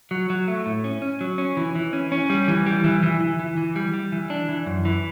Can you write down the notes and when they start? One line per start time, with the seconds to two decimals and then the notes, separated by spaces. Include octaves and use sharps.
0.11 F#3
0.30 F#3
0.48 A3
0.66 A2
0.84 C#4
1.02 C#4
1.21 F#3
1.38 C#4
1.57 E3
1.75 E3
1.93 C#4
2.12 C#4
2.30 G3
2.48 E3
2.66 G3
2.84 E3
3.03 E3
3.20 E3
3.39 E3
3.57 E3
3.76 G3
3.94 G3
4.12 E3
4.30 D4
4.49 E3
4.66 F#2
4.85 E3